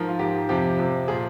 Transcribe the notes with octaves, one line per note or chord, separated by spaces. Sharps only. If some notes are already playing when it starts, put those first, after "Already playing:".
Already playing: G#2 F3 A#4
F4
G#2 F3 G4
F2 C3 F3 G4
F2 C3 F3
A#2 F3 G#4